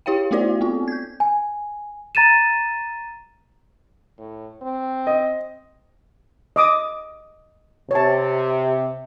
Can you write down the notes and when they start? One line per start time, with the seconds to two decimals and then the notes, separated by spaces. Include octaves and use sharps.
0.06 E4 G4 C#5 F5 G5
0.31 A3 B3 E4 F#4 C5 D5
0.61 B3 C4 F4
0.88 G6 G#6
1.20 G#5
2.15 A#5 A6 D#7 E7
4.18 A2
4.62 C4
5.07 D#5
6.56 D#5 D6 D#6
7.91 C3 C#5 A5